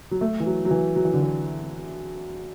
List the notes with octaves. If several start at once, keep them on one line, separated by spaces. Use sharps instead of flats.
F#3
A3
E3
F#3
F#3
E3
F#3
E3
D3
E3